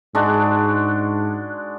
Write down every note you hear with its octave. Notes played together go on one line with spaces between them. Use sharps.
G#2 G#3 D4 F#4